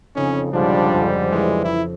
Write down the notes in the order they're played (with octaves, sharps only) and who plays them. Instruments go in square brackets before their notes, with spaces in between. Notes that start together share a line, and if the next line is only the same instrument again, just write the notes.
[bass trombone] F2 [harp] C#3 D#4 [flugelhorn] C#4
[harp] B1 [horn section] G#2 D3 G3 [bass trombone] F3 [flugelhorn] D4
[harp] F2
[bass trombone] E3 [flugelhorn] G#3
[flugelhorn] E4